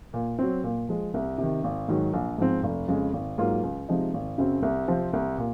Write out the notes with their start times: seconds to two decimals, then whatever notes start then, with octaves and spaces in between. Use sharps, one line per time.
0.14 A#2
0.39 F#3 C4
0.64 A#2
0.89 F3 G#3
1.14 C2
1.38 C3 D#3
1.64 G#1
1.88 G#2 D#3 F#3
2.13 A#1
2.38 G#2 F3 C4
2.63 F1
2.88 F2 C#3 G#3
3.13 G#1
3.38 G#2 F#3 A#3 F4
3.63 C#2
3.89 C3 F3 G#3 D#4
4.14 G#1
4.38 F#2 C#3 F#3 C4
4.62 C2
4.88 C3 F3 C4
5.13 C2
5.38 A#2